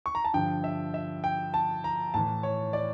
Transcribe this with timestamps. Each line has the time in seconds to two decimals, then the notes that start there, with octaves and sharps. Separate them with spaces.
0.06 C#6
0.15 A#5
0.25 A5
0.34 G2 D3 F3 G5
0.64 E5
0.94 E5
1.24 G5
1.54 A5
1.84 A#5
2.14 A2 E3 A5
2.43 C#5
2.73 D5